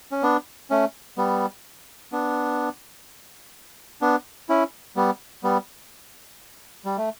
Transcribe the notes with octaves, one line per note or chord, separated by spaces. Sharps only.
C#4
B3 D4
A3 C#4
G3 B3
B3 D4
B3 D4
C#4 E4
G3 B3
G3 B3
G3
A3